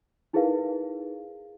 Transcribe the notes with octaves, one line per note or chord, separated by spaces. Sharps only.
D#4 E4 G#4 A#4 B4 F5